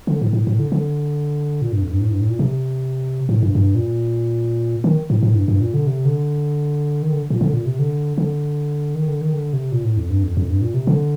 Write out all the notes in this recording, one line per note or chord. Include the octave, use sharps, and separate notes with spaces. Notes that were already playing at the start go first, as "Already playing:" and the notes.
D3
A2
A2
A2
D3
D3
A#2
G2
F2
G2
A2
G2
A2
A#2
C3
A2
G2
G2
A#2
D#3
A2
A2
G2
G2
A#2
D3
C3
D3
D#3
D3
A#2
D3
A#2
C3
D3
D3
D#3
D3
D#3
D3
C3
A#2
A2
F2
G2
F2
F2
G2
A#2
C3
D3